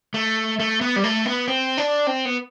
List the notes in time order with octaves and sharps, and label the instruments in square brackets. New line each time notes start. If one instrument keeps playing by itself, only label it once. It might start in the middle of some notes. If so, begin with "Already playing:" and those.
[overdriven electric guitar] A3
A3
B3
G3
A3
B3
C4
D4
C4
B3